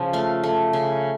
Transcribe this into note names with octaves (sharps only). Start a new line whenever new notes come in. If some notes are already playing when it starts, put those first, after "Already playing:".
Already playing: C#3 F3
A3 F5
A3
C#3